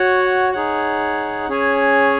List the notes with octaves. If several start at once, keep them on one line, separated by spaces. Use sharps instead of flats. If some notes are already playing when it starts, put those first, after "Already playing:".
Already playing: F#4 C#5 F#5
D#4 G#4 C#5 F#5
C#4 G#4 C#5 G#5